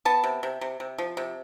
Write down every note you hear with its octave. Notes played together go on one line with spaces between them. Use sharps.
B3 A5
C3
C3
C3
C3
F3
C3